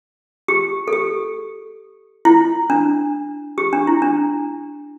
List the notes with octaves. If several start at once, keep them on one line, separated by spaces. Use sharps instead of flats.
G4
A4
G4
E4
D4
G4
D4
E4
D4